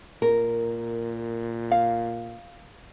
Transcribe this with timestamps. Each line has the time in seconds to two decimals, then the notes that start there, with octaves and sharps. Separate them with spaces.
0.22 A#2 A#4
1.71 F5